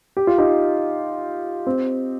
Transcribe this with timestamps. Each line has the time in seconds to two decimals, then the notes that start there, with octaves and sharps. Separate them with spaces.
0.17 G4
0.27 F4
0.38 D#4 G4
1.67 C4